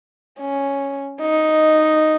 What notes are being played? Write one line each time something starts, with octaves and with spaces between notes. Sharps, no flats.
C#4
D#4